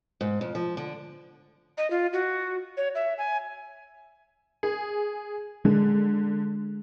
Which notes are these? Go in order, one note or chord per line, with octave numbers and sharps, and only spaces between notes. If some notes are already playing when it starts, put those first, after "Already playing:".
G#2
F2
F3
D3
D#5
F4
F#4
C#5
E5
G#5
G#4
D3 G#3